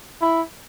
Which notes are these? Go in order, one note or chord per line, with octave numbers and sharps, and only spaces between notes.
E4